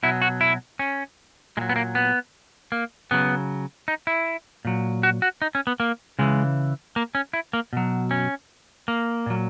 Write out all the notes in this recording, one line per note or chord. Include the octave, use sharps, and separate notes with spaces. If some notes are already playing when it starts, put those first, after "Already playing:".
B2 F#3 E4
F#4
E4
C#4
A#2 F#3 G#3
B3
A#3
B3
A#3
C#3 F#3 B3
D#4
E4
A#2 F#3
F#4
F#4
D#4
C#4
B3
A#3
C#3 E3 G#3
A#3
C#4
E4
A#3
B2 F#3
C#4
A#3
A#2 F#3